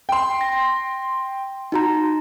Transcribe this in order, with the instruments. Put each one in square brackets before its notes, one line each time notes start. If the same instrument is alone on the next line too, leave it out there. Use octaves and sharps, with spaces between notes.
[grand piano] G5 C6
[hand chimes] A#6
D#4 F#4 A#5